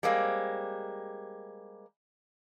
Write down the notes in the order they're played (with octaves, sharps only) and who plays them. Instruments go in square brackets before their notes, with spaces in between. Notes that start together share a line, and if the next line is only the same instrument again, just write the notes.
[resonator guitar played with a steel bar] G3 G#3 A#3 C4